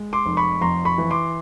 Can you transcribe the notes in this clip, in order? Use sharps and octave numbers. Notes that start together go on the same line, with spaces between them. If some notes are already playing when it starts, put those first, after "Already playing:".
Already playing: G#3
C6 D6
F1
B5 C#6
F2 A#5 C6
B5 C#6
E3
C6 D6